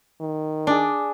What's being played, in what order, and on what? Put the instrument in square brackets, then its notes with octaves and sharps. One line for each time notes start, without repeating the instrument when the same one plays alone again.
[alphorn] D#3
[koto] D4 [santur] G#4 D5